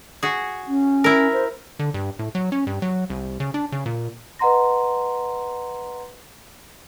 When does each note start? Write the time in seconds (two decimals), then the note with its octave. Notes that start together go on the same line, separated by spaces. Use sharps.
0.23 F#4 G#4
0.68 C#4
1.04 E4 A#4
1.33 C5
1.79 D3
1.94 G2
2.19 A2
2.35 F#3
2.52 C#4
2.67 G2
2.82 F#3
3.10 C2
3.40 C#3
3.54 D4
3.72 C#3
3.86 A#2
4.39 B4 D#5 F#5 A#5 C6 A#6